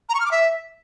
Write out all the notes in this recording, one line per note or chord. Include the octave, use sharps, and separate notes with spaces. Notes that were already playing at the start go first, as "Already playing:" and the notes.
A#5
C#6
F6
D6
E5